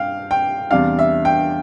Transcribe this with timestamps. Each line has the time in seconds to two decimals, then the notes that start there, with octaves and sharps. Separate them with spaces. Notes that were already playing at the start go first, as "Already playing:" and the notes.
Already playing: G2 F5 G5
0.31 G5
0.71 E2 C3 G3 D4 F5
0.99 E5
1.25 G5